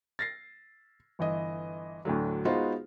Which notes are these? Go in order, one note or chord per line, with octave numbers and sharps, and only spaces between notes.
A6 A#6 C7
G1 E3 D#5
D2 A2 D3 F#3
G#3 B3 D#4 F4 F#4 C5